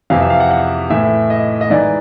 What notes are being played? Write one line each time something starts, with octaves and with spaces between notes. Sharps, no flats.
F2 C3 E3 F5
E5
F5
F#5
F#5
A2 E3 E5
D#5
D#5
G#2 E3 D5